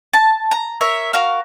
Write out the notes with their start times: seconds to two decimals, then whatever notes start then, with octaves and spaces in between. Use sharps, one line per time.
0.13 A5
0.51 A#5
0.81 A#4 C#5 E5
1.13 F#4 A#4 F5 F6